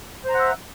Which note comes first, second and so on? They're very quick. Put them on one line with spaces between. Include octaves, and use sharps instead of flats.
C5 A#5 F#5 E5